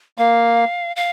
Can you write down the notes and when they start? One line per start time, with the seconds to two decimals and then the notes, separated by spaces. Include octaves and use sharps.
0.18 A#3 F5
0.96 F5